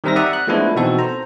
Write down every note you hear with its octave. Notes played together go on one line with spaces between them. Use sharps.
D#3 G3 C4 A#4 E5 A#6
D5 E5 F#5 A#5 D#6
F#6
F3 G#3 A3 B3 D4 E4
B2 E3 C4 D#4 F#4 A4
C5 A#5